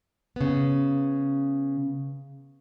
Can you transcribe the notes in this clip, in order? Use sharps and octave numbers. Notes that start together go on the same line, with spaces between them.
C#3 B3